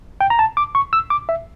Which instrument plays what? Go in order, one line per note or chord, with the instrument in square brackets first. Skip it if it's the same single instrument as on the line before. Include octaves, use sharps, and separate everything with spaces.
[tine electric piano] G5
A#5
A5
D6
C#6
E6
D6
E5